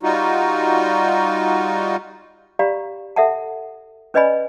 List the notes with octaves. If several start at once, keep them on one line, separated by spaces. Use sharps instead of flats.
G3 D#4 F4 F#4
G4 D5 F5 A#5 B5
A4 E5 F#5 A5
C#4 B4 D5 D#5 G#5 B5